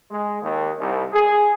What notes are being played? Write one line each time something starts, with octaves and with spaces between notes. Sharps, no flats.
G#3
D#2
C2
G#4